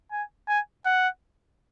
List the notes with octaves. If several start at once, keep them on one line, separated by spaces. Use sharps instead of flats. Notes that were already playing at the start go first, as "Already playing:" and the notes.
G#5
G#5
F#5